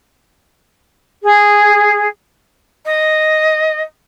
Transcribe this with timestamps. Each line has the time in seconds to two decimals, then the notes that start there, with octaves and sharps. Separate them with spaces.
1.23 G#4
2.85 D#5